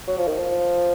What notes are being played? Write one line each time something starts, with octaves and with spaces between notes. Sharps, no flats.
F#3
F3
D#3
F3